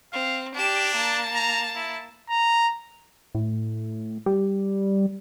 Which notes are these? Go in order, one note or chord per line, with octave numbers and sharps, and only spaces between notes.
C4 F5
D4 G4 E7
A#3 A5
A#5
E4
A#5
A2
G3